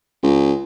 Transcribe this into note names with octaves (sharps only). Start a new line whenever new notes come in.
C#2